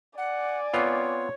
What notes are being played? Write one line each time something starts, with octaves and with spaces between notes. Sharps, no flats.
D5 F#5 G#5
B3 C4 F4 C#5